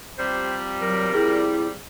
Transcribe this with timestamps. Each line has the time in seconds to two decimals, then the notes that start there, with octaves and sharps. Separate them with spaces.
0.18 C3 F3 G3 C5
0.82 F#3 A#4
1.15 E4 G#4